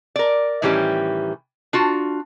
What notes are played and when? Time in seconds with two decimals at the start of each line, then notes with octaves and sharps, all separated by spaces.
0.16 A#4 D5
0.62 A2 D#3 E3 G3 C#4 G4
1.73 D4 F4 F#4